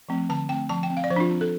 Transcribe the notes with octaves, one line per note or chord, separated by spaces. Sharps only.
F3 A3 C4
D3 A5
A3 C4 G5
F3 A5
G5
C4
F5
D5
F3 C5
D4
F4
C4
A4